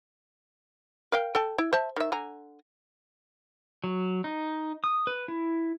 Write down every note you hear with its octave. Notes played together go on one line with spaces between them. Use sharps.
A#4 F5 G5
A4 G5 A5
E4
C5 E5 A5
D#3 E5
D3 G#5 A#5
F#3
D#4
D#6
B4
E4